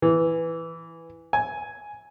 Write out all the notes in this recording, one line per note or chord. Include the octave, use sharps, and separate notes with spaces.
E3
G#5